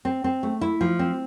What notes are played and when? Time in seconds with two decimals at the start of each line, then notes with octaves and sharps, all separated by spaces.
0.05 C4
0.24 C4
0.43 A3
0.61 E4
0.81 F3
0.99 C4